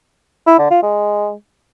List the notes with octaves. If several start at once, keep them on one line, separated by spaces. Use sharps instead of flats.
E4
D3
F4
G#3